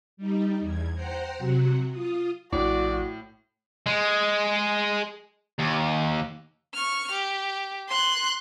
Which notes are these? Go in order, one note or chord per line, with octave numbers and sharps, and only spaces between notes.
G3 D#4
E2 G#6
C5 F#5 G5 A#5 C6
C3 F#3 F#4
F4 D#6
A#1 A2 F#4 D5
G#3
D#2
C#6 F6
G4
C6 F#6